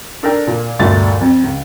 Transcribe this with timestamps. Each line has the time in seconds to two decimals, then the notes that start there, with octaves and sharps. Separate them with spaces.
0.23 D4 A4 A#4 G5
0.47 A#2
0.79 G1 D2 A#2 A3 A6
1.21 F2
1.44 C#2